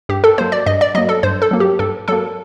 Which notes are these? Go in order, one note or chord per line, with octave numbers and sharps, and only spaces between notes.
G2 G4
A4
F#3 A#3 C5
D5
G2 D#5
D5
F#3 A#3 D#5
A4
G2 C5
A4
F#3 A#3
G4
G2 A4
F#3 A#3 A4